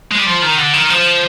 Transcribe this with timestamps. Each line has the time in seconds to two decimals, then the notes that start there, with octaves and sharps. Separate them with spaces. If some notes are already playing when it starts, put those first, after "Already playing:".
0.11 G#3
0.18 G3
0.26 F3
0.42 D#3
0.58 D3
0.73 D#3
0.90 F3